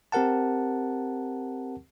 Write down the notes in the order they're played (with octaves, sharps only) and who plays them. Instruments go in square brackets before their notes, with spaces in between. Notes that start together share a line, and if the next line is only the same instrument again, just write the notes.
[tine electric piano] C4 G4 A#4 F#5 A5